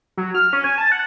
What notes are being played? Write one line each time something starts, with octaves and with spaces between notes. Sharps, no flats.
F#3
F6
C#4
G#5
A5
F#5